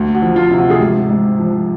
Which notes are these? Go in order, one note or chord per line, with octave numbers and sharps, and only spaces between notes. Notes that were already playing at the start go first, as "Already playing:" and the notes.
Already playing: D2
F#4
F3
F4
C3
F#4
G#4
G#2 G4
G#2
F3